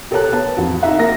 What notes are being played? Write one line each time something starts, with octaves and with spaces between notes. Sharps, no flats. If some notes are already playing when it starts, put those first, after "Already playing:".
G4 A4 A#4 C#5 A5 F#6
B3 A5
F2 F#4
D#4 F#4 E5 F#5
A#3 A#4 A#6